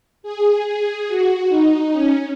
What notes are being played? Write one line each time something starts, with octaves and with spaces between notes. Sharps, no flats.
G#4
G#4
F#4
D#4
C#4